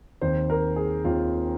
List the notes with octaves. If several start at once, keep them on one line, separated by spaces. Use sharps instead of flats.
D#2 D#3 C4 C5
A#4
G#4
D#2 D#3 C4 F4